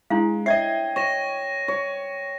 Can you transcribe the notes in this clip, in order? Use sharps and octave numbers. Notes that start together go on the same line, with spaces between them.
G#3 D4 E4 F5
C#5 D#5 E5 G5 G#6 C7
C#5 C#6 A#6 E7
C#5